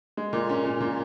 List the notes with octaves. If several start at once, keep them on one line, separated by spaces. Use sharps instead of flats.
G#3
A#2
C#4
A#2
A#2